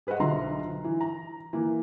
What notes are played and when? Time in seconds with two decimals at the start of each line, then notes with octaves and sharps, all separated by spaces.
0.07 G#4 B4 C5 D#5 F#5
0.20 B1 D3 F4 E5 A#5 C6
0.84 E3
1.01 A#5
1.53 E3 A#3